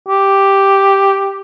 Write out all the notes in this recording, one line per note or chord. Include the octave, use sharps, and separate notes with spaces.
G4